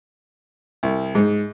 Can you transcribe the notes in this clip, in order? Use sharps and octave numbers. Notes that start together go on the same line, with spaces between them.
C2
G#2